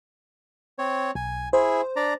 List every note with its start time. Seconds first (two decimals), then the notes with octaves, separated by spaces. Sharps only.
0.79 C4 C#5
1.15 B1 G#5
1.53 E4 G#4 C5
1.96 D4 D5 A#5